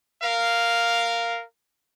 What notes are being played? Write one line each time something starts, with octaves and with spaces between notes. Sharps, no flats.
A#4 F5